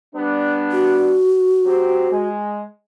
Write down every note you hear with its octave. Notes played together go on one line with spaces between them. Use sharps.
G3 B3 D4
F#4
F#3 C4 G4
G#3